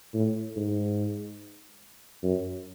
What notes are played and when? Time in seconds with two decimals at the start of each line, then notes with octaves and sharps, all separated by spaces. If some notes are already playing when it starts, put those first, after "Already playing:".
0.14 A2
0.56 G#2
2.23 F#2